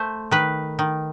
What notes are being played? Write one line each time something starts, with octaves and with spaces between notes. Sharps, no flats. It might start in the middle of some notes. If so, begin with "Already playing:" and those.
Already playing: A3 C5
D#3 B4
D#3